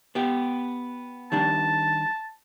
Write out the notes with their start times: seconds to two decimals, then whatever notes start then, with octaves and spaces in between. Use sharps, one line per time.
0.15 B3 G4
1.32 D#3 G3 D4 A5